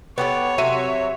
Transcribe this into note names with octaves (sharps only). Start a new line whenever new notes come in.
B3 G4 A4 C#5
C3 F#3 F#4 E5 D#7